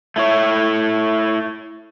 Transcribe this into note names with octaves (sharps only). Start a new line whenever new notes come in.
A3 E4 C#5